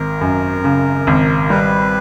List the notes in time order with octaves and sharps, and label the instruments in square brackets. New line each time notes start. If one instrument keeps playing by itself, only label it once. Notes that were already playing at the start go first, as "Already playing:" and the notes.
Already playing: [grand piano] G#1 [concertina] A#4
[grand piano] F#2
C#3
G#1
[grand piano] G3 [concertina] B4